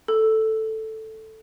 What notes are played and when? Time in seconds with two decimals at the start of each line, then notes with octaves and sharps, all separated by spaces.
0.08 A4